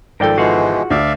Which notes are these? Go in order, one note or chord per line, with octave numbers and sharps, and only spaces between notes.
G#1 F3 A4 A#4 D5 G5
B2 E3 G#3 F4 F#4 G#4
D2 D5 E5 F5